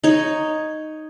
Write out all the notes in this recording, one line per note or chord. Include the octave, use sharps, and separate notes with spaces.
D#4 C#5